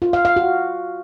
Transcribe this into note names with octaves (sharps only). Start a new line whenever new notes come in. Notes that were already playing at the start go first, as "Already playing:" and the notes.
F4
F5
F5
F#4